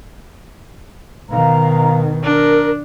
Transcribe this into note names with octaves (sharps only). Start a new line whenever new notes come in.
B2 D#3 F5 A#5
D4 A#4